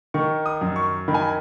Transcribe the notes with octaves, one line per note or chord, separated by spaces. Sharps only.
D#3 C#6
D#6
F#2
C#6
D#3 B5
G#5
B5